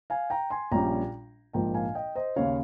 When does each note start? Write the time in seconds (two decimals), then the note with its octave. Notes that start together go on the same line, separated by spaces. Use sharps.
0.10 F5 G#5
0.30 G5 A#5
0.51 G#5 C6
0.72 A#1 A#2 G3 C#4 G5 A#5
1.53 A#1 G#2 F3 A#3 G5 A#5
1.74 F5 G#5
1.95 D#5 G5
2.15 C5 D#5
2.36 D#2 C#3 C#5 F5